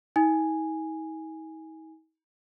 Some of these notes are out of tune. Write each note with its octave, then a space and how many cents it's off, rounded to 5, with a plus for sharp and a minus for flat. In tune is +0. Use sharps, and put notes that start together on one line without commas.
D#4 +45 G#5 -5